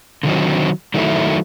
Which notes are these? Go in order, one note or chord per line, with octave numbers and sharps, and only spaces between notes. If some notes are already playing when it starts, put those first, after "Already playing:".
D3 D#3 F#3 C4
D#3 F#3 A3 E4